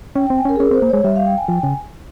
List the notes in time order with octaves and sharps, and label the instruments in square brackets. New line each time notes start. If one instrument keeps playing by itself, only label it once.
[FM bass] C#4 [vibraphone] G5
[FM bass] C4 [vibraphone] G5
[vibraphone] G#5
[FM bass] C#4 [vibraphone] A#4
[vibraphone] G#4
[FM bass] C#4 [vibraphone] A#4
[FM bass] C4
[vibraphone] C5
[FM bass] A#3
[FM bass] G#3 [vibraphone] C#5
[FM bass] G3 [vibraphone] E5
[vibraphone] F5
G5
G#5
[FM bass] F3 [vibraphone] G5
[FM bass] C#3 [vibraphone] G#5